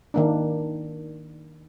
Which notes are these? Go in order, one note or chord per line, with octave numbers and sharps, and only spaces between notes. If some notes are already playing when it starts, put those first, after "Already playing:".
D#3 A#3 D4